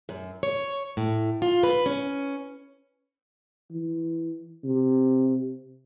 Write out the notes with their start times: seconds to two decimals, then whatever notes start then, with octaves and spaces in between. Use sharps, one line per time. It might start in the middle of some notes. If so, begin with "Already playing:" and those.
0.09 F#2
0.43 C#5
0.97 A2
1.42 F4
1.63 B4
1.86 C#4
3.71 E3
4.64 C3